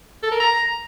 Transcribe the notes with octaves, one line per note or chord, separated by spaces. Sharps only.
A4
A#4
A#5